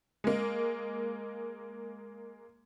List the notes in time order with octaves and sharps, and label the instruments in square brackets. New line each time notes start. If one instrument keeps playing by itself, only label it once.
[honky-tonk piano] G#3 A#3